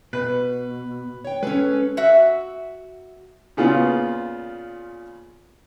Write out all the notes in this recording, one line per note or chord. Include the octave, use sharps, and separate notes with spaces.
B2 B4
C#5 G5
G#3 C#4 G#4 A4 B4
F#4 E5
A#2 C#3 B3 F4